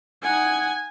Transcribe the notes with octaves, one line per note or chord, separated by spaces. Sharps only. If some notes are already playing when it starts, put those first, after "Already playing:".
D#4 F#5 G#5